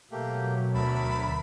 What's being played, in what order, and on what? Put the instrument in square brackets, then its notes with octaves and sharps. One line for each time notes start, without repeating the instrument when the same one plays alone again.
[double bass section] B2 F#3 [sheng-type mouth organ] A3 A#3 G4
[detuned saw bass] D2 [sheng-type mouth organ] A#4 E5 A5 [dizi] B5